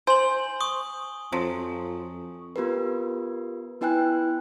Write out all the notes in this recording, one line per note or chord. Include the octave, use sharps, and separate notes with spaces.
C5 G#5 F#7
C#6 D#6
F2 F3 F#3
B3 F4 G4 A#4 B4
B3 E4 B4 G5 G#5 F#6